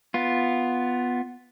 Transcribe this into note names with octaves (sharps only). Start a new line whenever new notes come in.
B3 F4